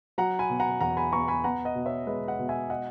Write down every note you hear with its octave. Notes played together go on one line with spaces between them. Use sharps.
F#3 F#5 A#5
G#5 B5
B2
F#5 A#5
E2 F#5 A#5
G#5 B5
B3 A#5 C#6
G#5 B5
B3 F#5 A#5
D#5 F#5
B2
C#5 E5
G#3 B4 D#5
D#5 F#5
B2
E5 G#5
D#5 F#5